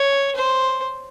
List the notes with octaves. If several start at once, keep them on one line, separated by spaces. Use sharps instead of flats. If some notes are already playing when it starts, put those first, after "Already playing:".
Already playing: C#5
C5